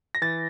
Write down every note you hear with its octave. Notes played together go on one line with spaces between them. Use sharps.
A#6
E3 A6